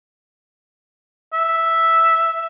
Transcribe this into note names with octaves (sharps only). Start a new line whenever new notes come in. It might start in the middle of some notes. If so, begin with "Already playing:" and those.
E5